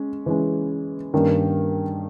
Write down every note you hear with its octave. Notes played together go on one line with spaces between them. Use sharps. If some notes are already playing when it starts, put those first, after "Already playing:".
Already playing: G#3 C#4
E3 G#3 C#4
G2 D#3 A#3 C#4